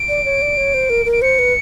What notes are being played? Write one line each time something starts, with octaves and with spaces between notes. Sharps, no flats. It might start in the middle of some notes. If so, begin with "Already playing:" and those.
Already playing: D7
D5
C#5
D5
C#5
C5
A#4
A#4
D7
C5 C#7
B4